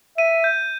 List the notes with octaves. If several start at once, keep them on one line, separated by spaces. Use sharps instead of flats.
E5 D#7
G6